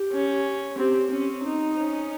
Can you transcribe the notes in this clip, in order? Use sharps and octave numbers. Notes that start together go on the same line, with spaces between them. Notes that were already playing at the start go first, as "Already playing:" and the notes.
Already playing: G4
C#4
C4 G4
C4 C#4
D#4
C#4